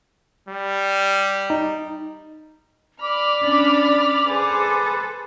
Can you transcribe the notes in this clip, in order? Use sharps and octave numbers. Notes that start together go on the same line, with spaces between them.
G3
D#4
D5 B5 D6 F6
C#4 D4
G#4 A4 B4 C5